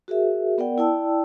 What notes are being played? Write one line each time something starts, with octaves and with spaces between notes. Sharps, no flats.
F#4 G#4 A#4 E5
B3 A#4 D5 F#5 G5
E4 D5 G5 A5 E6